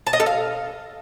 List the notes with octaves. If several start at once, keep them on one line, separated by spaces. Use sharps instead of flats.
A5
D#5
A4
F5